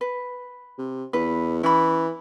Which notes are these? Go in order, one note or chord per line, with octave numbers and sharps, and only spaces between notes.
B4
C3
E2 B4
E3 C#4 B5